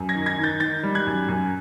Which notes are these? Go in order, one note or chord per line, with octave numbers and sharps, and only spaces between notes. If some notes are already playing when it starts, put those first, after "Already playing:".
Already playing: F#2
G#6 A#6
D#3
G#6 A#6
D#3
G6 A6
D#3 G6 A6
G3
F#6 G#6
F#2
F#2